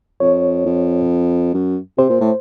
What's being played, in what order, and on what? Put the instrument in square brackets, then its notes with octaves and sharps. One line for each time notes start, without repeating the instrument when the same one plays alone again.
[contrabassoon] F2 [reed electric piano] C#5
[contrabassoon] F2
F#2
[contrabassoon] C3 [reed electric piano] C5
[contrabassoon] A#2
A2